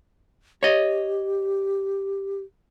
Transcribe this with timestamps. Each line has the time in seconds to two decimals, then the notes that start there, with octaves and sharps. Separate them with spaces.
0.63 G4 C#5 D#5